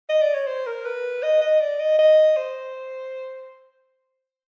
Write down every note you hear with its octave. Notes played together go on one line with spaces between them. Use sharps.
D#5
D5
C#5
C5
A#4
B4
D#5
D#5
D5
D#5
D#5
C5